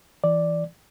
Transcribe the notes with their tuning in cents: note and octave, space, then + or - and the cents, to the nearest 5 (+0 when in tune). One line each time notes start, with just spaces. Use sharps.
E3 +0 D5 +0